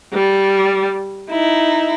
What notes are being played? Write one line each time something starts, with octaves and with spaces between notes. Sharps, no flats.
G3
D#4 E4